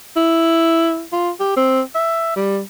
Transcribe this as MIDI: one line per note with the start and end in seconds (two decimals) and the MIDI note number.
0.16 1.03 64
1.13 1.30 65
1.40 1.54 67
1.57 1.81 60
1.95 2.33 76
2.36 2.60 55